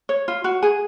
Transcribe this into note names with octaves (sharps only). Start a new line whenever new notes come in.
C#5
F4
F#4
G#4